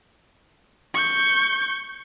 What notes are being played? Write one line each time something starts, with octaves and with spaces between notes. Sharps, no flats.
C#6 G6